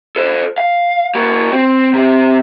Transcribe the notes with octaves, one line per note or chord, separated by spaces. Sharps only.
A4 C5
F5
A#3 F#4
C4
C3 C4